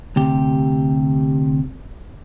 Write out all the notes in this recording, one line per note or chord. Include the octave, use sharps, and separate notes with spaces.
D2 C3 G4